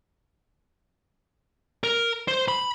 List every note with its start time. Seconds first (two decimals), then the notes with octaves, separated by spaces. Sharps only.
1.84 A#4
2.28 C5
2.48 B5